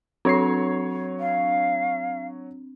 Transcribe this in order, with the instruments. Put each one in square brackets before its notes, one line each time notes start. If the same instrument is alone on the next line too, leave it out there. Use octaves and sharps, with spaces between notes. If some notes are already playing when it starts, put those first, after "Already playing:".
[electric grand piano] F#3 C#5 C7 [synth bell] C4 D4
[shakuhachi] F5